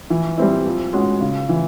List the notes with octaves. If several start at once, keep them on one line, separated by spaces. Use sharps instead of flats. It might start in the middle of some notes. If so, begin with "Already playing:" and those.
E3
G3 C4 E4
F3
G#3 C#4 F#4
C#3
E3